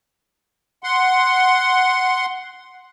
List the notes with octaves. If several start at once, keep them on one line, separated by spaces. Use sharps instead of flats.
F#5 C6